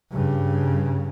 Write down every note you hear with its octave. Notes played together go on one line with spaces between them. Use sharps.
G2 C#3